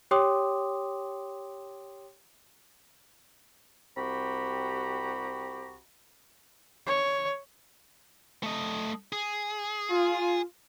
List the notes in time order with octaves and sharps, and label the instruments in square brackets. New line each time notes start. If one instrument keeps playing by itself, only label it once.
[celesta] G4 C#5 G5 C6 D6 D#6
[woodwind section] C2 C4 F#4 G4 A#5 B5
[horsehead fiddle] C#5
[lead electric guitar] A3 D#5
G#4
[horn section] F4